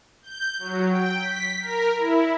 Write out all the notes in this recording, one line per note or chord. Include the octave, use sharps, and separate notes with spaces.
G6
F#3
G5
B6
A#4
E4